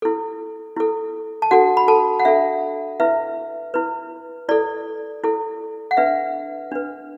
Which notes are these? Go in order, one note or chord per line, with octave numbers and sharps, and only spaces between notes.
E4 A4
E4 A4
A5
D4 F#4 A4 F#5
B5
A4 A5
F#5
D4 A4 E5
E4 B4 E5
E4 B4
E4 A4 D5
E4 A4
F#5
D4 B4 E5
D4 B4